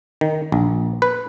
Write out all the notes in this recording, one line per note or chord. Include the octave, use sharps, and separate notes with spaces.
D#3
A#1
B4